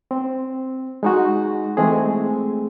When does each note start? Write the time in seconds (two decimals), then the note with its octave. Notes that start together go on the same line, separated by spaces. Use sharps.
0.11 C4
1.03 G#3 D#4 F#4
1.77 E3 G#3 A3 C4 G#4